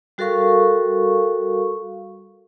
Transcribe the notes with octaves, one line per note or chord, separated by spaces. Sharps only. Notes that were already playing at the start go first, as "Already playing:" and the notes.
G3 F#4 A4 A#4 F5 C#6